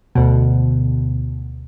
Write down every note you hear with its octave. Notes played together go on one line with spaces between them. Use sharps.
D2 B2